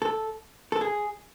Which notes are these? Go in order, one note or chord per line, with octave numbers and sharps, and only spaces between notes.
A4
A4
G#4